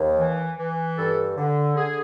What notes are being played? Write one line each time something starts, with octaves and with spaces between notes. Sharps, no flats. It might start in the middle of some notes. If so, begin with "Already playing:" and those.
Already playing: D#2
E3
E3
G2 A4
D3
D3 G#4